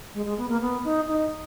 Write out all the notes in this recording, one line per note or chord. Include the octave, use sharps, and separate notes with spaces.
G#3
G#3
B3
A#3
B3
D#4
D#4